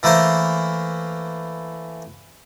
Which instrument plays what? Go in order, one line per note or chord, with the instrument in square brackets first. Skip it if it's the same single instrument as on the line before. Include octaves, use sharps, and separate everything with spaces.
[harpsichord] E3 A3 A#3 A#4 C5